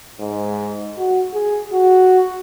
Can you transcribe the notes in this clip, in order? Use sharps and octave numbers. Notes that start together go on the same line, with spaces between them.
G#2
F#4
G#4
F#4